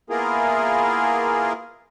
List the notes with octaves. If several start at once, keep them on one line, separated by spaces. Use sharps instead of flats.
A#3 B3 E4 F4 G#4 A#4